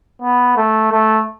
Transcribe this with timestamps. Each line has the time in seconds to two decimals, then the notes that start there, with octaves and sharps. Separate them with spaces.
0.22 B3
0.57 A3
0.92 A3